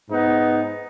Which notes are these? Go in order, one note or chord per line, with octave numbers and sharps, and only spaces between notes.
G#2 B3 D#4